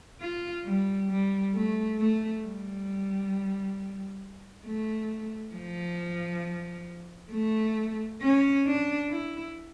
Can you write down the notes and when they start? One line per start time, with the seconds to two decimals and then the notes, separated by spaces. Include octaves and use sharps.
0.21 F4
0.65 G3
1.10 G3
1.54 A3
1.98 A3
2.44 G3
4.66 A3
5.55 F3
7.33 A3
8.22 C#4
8.66 D4
9.10 E4